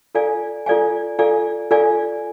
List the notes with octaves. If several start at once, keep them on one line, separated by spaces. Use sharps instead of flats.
F4 A4 D5 F5 G#5
F4 A4 D5 F5 G#5
F4 A4 D5 F5 G#5
F4 A4 D5 F5 G#5